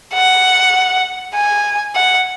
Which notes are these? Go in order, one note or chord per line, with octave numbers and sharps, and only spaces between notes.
F#5
G#5
F#5